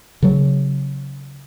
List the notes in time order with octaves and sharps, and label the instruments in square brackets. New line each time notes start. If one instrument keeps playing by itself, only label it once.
[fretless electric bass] C#3 F#3